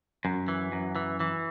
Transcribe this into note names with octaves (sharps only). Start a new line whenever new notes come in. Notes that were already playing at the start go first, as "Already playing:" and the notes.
F#2
E3
F#2
E3
E3